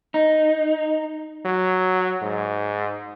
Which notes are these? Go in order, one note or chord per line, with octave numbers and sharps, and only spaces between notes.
D#4
F#3
G#2